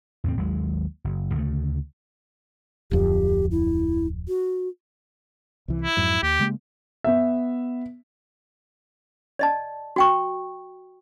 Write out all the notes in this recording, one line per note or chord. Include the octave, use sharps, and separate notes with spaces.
E2 A2 A3 C4
G#1 D#2 F#3 G#3
F#1
D2 C#3 E3 A3
D1 F2 G4
E4
F#4
C2 E3
E4
F2 G#2 F#3
D#2 G4
C#3 G#3 A#3
B3 E5
D5 D#5 A5
F#4 G5 C#6